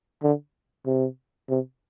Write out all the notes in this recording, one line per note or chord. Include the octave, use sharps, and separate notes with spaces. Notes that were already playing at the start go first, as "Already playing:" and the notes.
D3
C3
C3